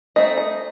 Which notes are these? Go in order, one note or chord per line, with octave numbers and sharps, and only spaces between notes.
A3 C4 D#4 D#5
D#5